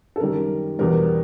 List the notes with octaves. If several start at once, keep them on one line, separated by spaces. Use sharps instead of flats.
A4
F#2 D#3 G3 A#4
E2 B2 G3 A#4